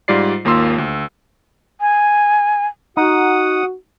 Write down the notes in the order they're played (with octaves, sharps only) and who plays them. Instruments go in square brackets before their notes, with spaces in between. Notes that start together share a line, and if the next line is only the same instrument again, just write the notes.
[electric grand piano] G#2 G3 F4 D5 C7
G#1 D#2 A#3 F4 C6 E6
D2
[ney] G#5
[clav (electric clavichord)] D#4 [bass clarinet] F#4 [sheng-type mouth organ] F#5 D#6